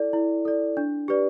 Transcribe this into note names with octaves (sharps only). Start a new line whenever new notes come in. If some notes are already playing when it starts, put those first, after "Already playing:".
Already playing: E4 A4 D5
E4
A4 D5
D4
G4 B4 D5